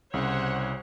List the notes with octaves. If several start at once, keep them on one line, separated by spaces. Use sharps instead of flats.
C2 C#3 C5 C#5 F#5